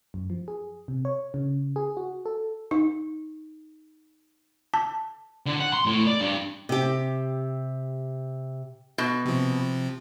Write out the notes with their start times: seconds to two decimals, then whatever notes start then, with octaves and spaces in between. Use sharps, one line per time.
0.14 F#2
0.30 F3
0.48 G#4
0.88 C3
1.05 C#5
1.34 C#3
1.76 G#4
1.97 F#4
2.26 A4
2.71 D#4
4.74 A5
5.46 D3
5.60 F#5
5.73 C6
5.86 A2
6.07 D5
6.20 G2
6.69 C3 G4
8.98 B2
9.25 C3 F3